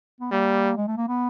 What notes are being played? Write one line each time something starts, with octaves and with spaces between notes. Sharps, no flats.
B3
G3 A#3
G#3
A3
A#3
B3